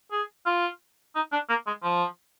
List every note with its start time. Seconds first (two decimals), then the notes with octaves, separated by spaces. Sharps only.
0.12 G#4
0.46 F4
1.16 D#4
1.32 D4
1.49 A#3
1.67 G#3
1.83 F3